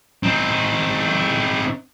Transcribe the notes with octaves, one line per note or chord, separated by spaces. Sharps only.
C4 D#4